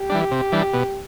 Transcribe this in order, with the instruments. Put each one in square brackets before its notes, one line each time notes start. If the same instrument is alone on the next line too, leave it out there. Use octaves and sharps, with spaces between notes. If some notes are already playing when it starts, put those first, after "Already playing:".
Already playing: [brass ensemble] G4
[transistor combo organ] E3 G3 D4
C3
E3 G3 D4
B2